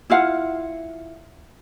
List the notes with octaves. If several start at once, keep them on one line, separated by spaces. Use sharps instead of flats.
E4 F4 F5 F#5